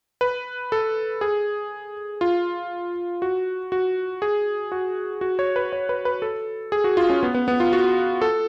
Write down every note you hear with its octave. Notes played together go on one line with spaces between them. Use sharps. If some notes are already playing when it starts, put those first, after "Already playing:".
B4
A4
G#4
F4
F#4
F#4
G#4
F#4
F#4
C#5
B4
C#5
B4
B4
A4
G#4
F#4
F4
C#4
B3
B3
B3
F4
F#4
A4